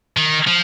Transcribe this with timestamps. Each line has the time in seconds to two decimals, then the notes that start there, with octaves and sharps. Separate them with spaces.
0.17 D#3
0.47 F3